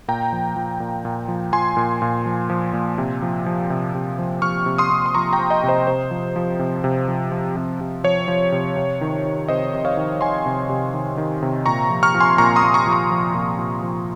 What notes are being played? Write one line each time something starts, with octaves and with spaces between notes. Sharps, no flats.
A#2 G5 A#5
F3
F3
A#2
A#2
F3
F3 G#5 C6
A#2
A#2
F3
F3
A#2
C3
F3
F3
C3
C3
F3
F3 C#6 F6
C3
C6 D#6
C3
C6
F3 A#5 C#6
G5 A#5
F3
D#5 G5
C3
C5 D#5
C3 C5
F3
F3
C3
C3
F3
F3
C3
C3
F3 C#5
F3
C3
C3
D#3
D#3
C3 C5 D#5
C3
C#5 F5
D#3
D#3 G#5 C6
C3
C3
D#3
D#3
C3
A#2 A#5 C#6
F3
C#6 F6
F3
G#5 C6
A#2 A#5 C#6
C6 D#6
A#2
A#5 C#6
F3
A#5 C#6
F3
A#2
A#2
F3